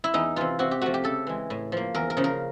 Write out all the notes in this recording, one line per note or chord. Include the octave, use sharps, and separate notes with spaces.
E4
E2 D#4
C3 E3 F4
C3 F#4
G4
F3 A3 F#4
G4
C#3 A4
E3 G#3
A2
F3 A#3
E2 A#4
A#4
C#3 F3
A#4